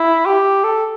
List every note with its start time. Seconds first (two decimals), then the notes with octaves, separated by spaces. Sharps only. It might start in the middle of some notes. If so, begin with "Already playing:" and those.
Already playing: E4
0.26 G4
0.64 A4